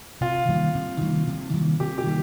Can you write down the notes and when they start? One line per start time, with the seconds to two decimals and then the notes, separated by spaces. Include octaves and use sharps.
0.21 C3 F4
0.49 D#3 G3 A#3
0.75 C3
1.01 D#3 G3 A#3
1.27 C3
1.54 D#3 G3 A#3
1.80 C3 G4
1.98 G4
2.07 D#3 G3 A#3